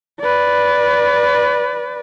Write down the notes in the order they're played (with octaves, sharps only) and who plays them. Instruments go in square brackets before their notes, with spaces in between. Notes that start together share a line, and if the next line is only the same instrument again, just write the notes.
[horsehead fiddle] B4 D5